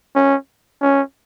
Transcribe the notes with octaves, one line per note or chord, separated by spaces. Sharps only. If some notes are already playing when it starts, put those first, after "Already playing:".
C#4
C#4